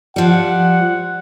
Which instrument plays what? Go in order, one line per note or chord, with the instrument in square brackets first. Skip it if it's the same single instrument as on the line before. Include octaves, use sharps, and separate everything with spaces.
[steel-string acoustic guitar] F3 G3 [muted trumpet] F#5